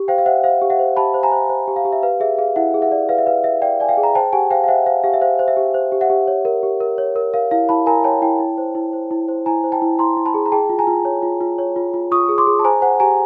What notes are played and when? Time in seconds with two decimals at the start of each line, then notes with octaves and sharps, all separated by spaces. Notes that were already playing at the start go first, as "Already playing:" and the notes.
Already playing: G4
0.08 C5 F5 G5
0.18 F5
0.26 C5 E5 F#5
0.44 C5 F5
0.61 G4
0.70 E5 F#5
0.79 C5
0.97 G4 A5 B5
1.14 C5
1.23 G#5 A#5
1.32 C5
1.49 C5
1.67 G4
1.76 F5
1.85 G4
1.93 E5
2.03 B4 F5
2.20 G#4 E5
2.38 G#4 F5
2.56 E4 E5 F#5
2.74 G#4
2.82 E5 F#5
2.92 D5
3.09 B4 F5
3.18 E5
3.27 B4 F5
3.44 B4 E5
3.62 D5 F5 G5
3.80 D5 G#5
3.89 F5 G5
3.97 G#4
4.03 A#5
4.15 C5 G5 A5
4.33 G4 F#5 G#5
4.50 C5 F5 G5
4.64 F5
4.68 C5 E5 F#5
4.86 C5 F5
5.04 G4 F5
5.13 E5
5.21 C5 F5
5.39 C5
5.48 E5
5.57 G4
5.74 C5
5.92 G4
6.01 E5 F#5
6.10 G4
6.28 C#5
6.45 A#4
6.63 G4
6.80 A#4
6.98 C#5
7.16 A#4
7.34 A#4 F5
7.51 E4 F5
7.69 E4 A5 B5
7.86 A#4 G#5 A#5
8.04 C#5 G5 A5
8.22 E4 G5 A5
8.40 E4
8.58 C5
8.75 E4
8.93 C5
9.11 E4
9.28 C5
9.46 E4 G#5 A#5
9.64 C5
9.72 G5 A5
9.82 E4
9.99 E4 A#5 C6
10.17 E4
10.25 A5 B5
10.34 G#4
10.46 A#5
10.52 G#4 G5 A5
10.69 F4
10.79 G#5 A#5
10.87 F4
11.05 C#5
11.23 F4
11.41 F4
11.58 C#5
11.76 F4
11.94 F4
12.12 F4 C#6 D#6
12.29 G#4
12.38 C6 D6
12.47 G#4
12.59 A5
12.64 C5 G#5 A#5
12.82 C5 F#5 G#5
13.00 G4 G#5 A#5